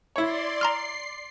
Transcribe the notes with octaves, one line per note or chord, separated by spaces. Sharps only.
E4 C#5 D5 C6
A#5 C6 F6 C7